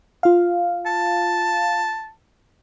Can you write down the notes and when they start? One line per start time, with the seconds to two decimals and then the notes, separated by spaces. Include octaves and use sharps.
0.23 F4 F5
0.86 A5